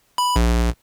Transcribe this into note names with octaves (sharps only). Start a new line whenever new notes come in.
B5
A#1